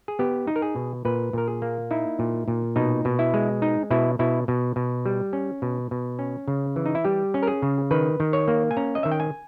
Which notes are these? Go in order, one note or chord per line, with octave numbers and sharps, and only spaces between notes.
G#4
B3 G4
D#4
A#4
G#4
B2
A#2 B4
A#2 A#4
G#4
A#3
D#4 E4
A#2
A#2
B2 D#4
B2
E4
G#3
D#4
B2 E4
B2 E4
B2
B2
G3
C#4
B2
B2
C#4
C#3
E3
D#4
E4
G3 G4
C#4
A#4
G#4
C#3
D#3 B4
D#3
C#5
A#3
G#5
C#4 A#5
D#5
D#3 E5
G5
G#5